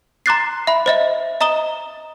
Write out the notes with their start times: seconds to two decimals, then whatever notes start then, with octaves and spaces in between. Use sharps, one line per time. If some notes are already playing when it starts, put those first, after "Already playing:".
0.26 A#5 C6 D6 F#6 A6 C7
0.67 E5 B5
0.86 C5 D#5 E5
1.41 D#5 A#5 D#6 E7 G7